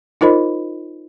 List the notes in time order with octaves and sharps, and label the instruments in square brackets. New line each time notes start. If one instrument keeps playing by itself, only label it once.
[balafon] D#4 F4 A#4 C5 D#5 B5